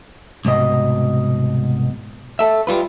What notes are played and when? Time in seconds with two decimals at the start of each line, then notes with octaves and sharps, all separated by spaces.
0.45 C2 G#2 B2 D#5
2.39 A4 E5
2.67 G3 F4 B4